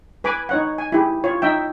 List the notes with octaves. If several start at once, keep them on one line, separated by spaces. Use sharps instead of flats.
B4 G#5 B5 D6
D#4 C#5 F#5
G#5
E4 G4 G#4
F4 C#5
D#4 E5 G5